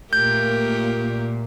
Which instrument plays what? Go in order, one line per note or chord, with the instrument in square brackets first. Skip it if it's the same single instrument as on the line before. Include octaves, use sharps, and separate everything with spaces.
[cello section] A#2 [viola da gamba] A3 G4 A#4 [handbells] G6